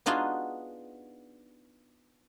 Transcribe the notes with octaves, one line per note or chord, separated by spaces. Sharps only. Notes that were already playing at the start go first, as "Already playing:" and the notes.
B3 D4 D#4 F4 F#4 G#4